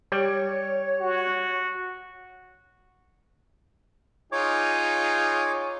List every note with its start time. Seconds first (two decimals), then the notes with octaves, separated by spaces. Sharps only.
0.12 G3 C#5 D5 G5
1.01 F#4
4.32 D#4 F4 G#4 C#5 D6